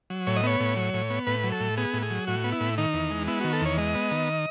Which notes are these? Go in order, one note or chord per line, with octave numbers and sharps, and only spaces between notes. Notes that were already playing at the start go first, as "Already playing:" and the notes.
F#3
A2 C#5
D#5
B3 C#5
A2
F#3
A2
B3
A2 B4
F#3
A4
A2
B3 G#4
A2
G#4
F#3
A2 F#4
B3
E4
A2
D#3 D#4
E2
G#3
B3 E4
D#3 F#4
A4
E2 C#5
G#3 D#5
B3
D#3